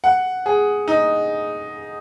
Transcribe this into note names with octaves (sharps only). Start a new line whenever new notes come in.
F#5
G#4
D#4